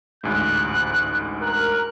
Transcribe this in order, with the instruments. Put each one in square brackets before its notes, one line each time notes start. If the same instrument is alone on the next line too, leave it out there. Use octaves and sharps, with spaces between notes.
[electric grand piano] A1 D2 G#2 [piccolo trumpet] F#6
[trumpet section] A#4 [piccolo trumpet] F#6